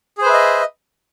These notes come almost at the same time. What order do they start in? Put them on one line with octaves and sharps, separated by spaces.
G#4 C5 B4 E5 D#5